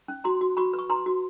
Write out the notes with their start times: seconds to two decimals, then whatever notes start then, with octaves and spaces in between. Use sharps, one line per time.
0.08 C#4
0.24 F#4 A#5 C6
0.41 F#4
0.57 F#4 B5 C#6
0.73 B4
0.78 C#6
0.90 B4 A#5 C6
1.06 F#4